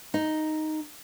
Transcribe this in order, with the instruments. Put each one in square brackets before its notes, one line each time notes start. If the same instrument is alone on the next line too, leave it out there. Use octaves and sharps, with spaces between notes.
[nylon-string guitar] D#4